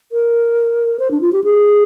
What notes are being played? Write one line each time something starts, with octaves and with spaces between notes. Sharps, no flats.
A#4
C5
D4
F4
G4
G#4